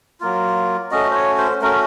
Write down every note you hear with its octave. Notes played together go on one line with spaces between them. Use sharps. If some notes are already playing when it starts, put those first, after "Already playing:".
F#3 A#3 F4
A3 C#4 F#4 D#5
C5
C#5
C5
A3 C#4 F#4 A#4